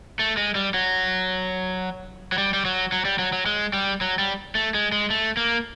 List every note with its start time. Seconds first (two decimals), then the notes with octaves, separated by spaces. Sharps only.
0.19 A3
0.37 G#3
0.55 G3
0.74 F#3
2.32 F#3
2.38 G3
2.54 G3
2.65 F#3
2.92 F#3
3.05 G3
3.19 F#3
3.33 F#3
3.46 G#3
3.73 G3
4.01 F#3
4.19 G3
4.55 A3
4.74 G#3
4.92 G#3
5.10 A3
5.37 A#3